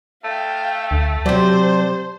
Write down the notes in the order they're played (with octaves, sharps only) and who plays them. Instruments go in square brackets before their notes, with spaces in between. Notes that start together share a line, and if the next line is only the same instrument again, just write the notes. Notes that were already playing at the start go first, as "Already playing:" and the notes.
[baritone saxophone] A3 [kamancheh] F5 G5
[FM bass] D2
[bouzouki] C3 D4 [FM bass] F#3 [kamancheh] C5